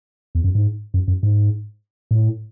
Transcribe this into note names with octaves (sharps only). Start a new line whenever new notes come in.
E2
F#2
G#2
F#2
F#2
G#2
A2